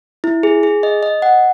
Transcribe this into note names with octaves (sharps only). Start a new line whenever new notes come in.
E4
G#4
G#4
D#5
D#5
F#5